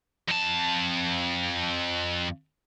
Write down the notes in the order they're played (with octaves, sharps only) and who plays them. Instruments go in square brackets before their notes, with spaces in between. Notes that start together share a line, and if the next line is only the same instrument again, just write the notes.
[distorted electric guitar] F2 A5